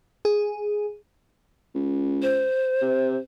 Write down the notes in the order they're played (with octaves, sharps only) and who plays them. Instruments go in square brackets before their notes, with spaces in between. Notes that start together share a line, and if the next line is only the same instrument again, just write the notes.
[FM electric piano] G#4
[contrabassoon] C#2
[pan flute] C5
[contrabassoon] C3